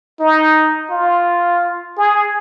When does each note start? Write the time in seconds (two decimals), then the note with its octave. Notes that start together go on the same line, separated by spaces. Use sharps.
0.20 D#4
0.91 F4
1.97 G#4